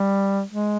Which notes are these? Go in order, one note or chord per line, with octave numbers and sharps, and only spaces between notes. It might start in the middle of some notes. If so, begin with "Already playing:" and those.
Already playing: G3
G#3